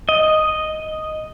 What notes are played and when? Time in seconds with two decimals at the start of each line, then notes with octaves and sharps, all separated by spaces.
0.09 D#5